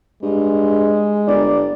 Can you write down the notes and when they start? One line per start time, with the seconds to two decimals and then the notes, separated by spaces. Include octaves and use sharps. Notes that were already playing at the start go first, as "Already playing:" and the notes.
0.23 G2 G#3
1.27 G1 D5